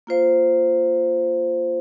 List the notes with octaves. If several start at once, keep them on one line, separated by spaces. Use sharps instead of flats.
A#3 F4 C5 F5